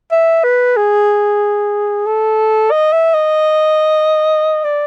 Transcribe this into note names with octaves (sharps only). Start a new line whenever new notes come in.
E5
B4
G#4
A4
D#5
E5
D#5
D5